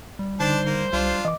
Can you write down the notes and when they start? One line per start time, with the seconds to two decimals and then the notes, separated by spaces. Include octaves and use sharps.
0.19 G3
0.40 D3 D4 D#4 C5 A5
0.66 A#3
0.93 C2 G3 D4 F4
1.25 E3 D#5 D6